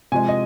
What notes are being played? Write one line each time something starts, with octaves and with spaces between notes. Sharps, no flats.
C3 F3 G#3 G#5
D#5